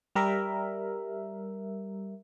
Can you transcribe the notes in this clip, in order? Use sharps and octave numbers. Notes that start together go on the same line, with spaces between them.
G3 A#4 E5